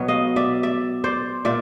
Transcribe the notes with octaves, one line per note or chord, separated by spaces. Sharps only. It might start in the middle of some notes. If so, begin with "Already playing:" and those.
Already playing: B2 F#3 B3
D#5 F5
D5 E5
D5 E5
C5 D5
A#2 D5 E5